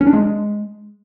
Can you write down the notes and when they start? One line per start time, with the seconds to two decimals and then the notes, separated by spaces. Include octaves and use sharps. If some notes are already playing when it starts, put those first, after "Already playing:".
0.01 C#4
0.07 D4
0.13 G#3